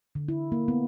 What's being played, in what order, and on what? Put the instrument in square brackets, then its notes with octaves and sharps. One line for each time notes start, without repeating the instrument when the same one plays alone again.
[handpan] D3
E4
A#3
B3